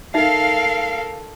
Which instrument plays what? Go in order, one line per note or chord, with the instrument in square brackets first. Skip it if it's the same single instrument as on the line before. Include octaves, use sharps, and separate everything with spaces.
[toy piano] D#4 E5 [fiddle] A4 A#4 [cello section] F5